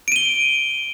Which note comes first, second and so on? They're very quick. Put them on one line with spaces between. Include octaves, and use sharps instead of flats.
D7 D#7 G7